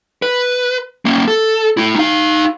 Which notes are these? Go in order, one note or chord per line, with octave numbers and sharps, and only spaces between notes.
B4
A#3 C#4
A4
A3 E4
D#4 F5